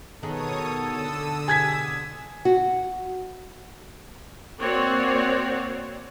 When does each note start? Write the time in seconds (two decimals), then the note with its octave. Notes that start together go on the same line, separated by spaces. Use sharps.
0.23 B2 D#3 B3 G#4 A4 C#5 D#6
0.85 D3 D#6 E6
1.48 B2 G4 G#4 G#5 G#6 B6
2.45 F#4
4.60 A#3 C4 F#4 C#5 D5